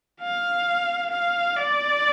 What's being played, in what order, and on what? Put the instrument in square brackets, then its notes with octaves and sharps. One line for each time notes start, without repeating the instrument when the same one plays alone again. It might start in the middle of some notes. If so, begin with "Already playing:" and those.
[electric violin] F5
F5
D5